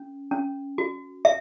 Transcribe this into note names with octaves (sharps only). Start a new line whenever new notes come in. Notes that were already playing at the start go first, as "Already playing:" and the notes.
Already playing: C#4
C#4
F#4
E5